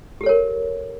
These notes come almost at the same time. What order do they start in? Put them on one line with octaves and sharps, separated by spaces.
G4 A4 C#5 A#4